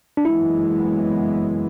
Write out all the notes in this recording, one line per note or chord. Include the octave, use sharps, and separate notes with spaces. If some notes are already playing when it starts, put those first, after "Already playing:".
D4
F#1 F#2 E3 G#3 B3 E4